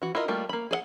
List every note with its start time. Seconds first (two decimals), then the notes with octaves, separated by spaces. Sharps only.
0.02 E3 F#4
0.15 E4 F4 A#4 D#5
0.28 G3 A3 A#3 F4
0.49 A#3 B5
0.71 G#4 D5 F#5